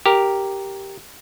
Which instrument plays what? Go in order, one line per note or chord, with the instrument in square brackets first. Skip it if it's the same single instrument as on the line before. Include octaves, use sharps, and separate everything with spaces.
[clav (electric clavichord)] G4 A#4